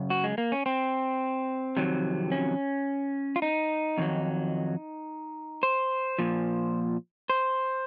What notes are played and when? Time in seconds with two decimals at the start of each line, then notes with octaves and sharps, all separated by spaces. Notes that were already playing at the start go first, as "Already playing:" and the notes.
Already playing: F#2 C#3
0.10 F#4
0.24 G#3
0.38 A#3
0.52 C#4
0.66 C4
1.77 F2 C3 D#3 F#3
2.32 C#4
3.36 F4
3.42 D#4
3.98 F2 D#3 F#3
5.63 C5
6.19 A#2 F3
7.30 C5